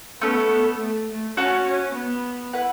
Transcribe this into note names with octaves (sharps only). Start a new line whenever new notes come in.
A3 B3 C#4 A4
B3
A3
A3
C#4 F#4 C#5 F#5 A5
C#4
B3
E4 B4 F#5